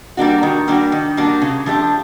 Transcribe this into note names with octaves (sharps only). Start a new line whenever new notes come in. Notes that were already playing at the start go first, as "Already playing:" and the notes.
G3 A#3 D4 F#4
D#3
G3 A#3 D4 F#4
D#3
G3 A#3 D4 F#4
C#3
F3 A3 D4 G4